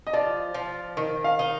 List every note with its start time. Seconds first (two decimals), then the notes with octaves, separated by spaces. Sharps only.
0.07 D#5
0.13 F3 D5
0.54 F3
0.97 D#3 D#5
1.24 F5
1.39 D#4